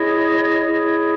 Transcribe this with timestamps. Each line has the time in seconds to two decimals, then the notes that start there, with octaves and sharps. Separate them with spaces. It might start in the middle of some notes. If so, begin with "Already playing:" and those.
Already playing: E4 G#4 C#5 D#5
0.65 E4 G#4 C#5